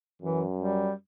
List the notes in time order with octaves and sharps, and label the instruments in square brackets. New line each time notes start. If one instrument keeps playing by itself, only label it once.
[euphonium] F#2 [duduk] E3
[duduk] G3